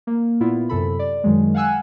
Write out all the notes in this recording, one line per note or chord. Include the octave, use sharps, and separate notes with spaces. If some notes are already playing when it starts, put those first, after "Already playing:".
A#3
A#2 B3 E4 F4
F#2 C3 A4 B5
D5
F#2 D#3 F#3 G#3
F5 F#5 G#5 E6 F#6